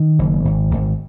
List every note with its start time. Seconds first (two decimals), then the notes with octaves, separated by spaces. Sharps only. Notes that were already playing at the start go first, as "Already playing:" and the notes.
Already playing: D#3
0.19 F#1
0.45 G#1
0.71 G#1